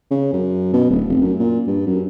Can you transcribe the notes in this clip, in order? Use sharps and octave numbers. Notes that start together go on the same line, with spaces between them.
C#3
F#2
B2
D1
F1
F#2
A#2
G2
F#2